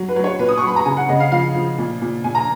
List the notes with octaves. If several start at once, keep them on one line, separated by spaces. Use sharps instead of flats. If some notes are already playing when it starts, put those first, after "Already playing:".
Already playing: F#3
B4
F#3
C#5
A#2 B4
D#6
F#3 C#6
B5
A#5
C#3 G#5
F#5
C#3 D#5
F5
F3 F5
F3
A#2
A#2
A#2 G#5
A#5